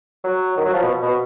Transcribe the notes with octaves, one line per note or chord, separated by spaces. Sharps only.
F#3
D#3
F#3
F3
B2
B2